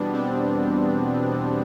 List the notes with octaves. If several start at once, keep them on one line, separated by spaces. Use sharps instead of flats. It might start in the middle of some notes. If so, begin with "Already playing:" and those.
Already playing: E2 B2 G3 B3 D4
C4